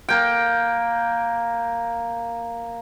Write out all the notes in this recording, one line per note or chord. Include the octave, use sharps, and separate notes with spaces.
A#3 G5